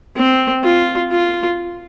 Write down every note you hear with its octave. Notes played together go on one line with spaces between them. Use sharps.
C4
F4
F4